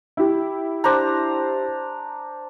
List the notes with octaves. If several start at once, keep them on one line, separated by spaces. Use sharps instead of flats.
E4 G4
D4 C5 A#5